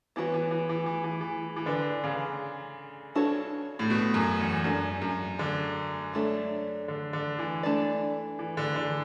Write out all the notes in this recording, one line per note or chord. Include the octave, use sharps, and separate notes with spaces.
E3 B3 F#4 C#5
E3
E3
E3
E3
E3
E3
E3
D3 D4 G#4 B4
C#3
D4 F#4 A4 C#5
A2
B2
F#2
E2
F#2 G#3 D4 F#4 A4
F#2
D3
F#3 A3 D4 A4 C#5
D3
D3
E3
A3 D4 A4 D5
E3
D3
D3